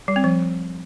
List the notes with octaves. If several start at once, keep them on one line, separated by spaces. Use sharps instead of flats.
G3
C4
F3